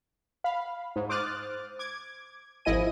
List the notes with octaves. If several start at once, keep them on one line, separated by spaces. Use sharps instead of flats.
F5 B5
G#2
C5 D6 D#6 F6 F#6 A6
D6 G#6
G#1 F3 E4 D#5 G#5 D#7